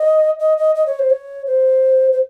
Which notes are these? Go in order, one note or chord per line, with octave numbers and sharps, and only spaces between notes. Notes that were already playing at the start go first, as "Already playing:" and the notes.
Already playing: D#5
D#5
D#5
D#5
C#5
C5
C#5
C5
C5